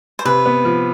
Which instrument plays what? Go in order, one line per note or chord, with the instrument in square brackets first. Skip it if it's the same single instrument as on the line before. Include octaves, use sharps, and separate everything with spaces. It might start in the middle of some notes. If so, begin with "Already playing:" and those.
[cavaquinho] C5
[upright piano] C3 [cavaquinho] B4
[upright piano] B3
F3